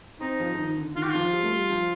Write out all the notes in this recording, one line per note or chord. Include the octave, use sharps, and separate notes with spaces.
C4 D#4
F3
F3
D#3
D3
D#3 F4
G4
F3 F4
G3
A3
G3
F3